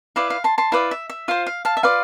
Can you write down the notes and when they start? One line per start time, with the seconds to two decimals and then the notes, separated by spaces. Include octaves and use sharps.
0.16 E4 B4 D5 F5
0.30 F5
0.44 A5 C6
0.58 A5 C6
0.72 E4 B4 D5 F5
0.91 E5
1.10 E5
1.28 F4 C5 F5
1.47 F5
1.65 F5 A5
1.77 E5
1.83 F4 B4 D5 F5